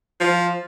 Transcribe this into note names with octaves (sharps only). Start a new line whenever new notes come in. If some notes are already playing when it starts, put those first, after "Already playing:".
F3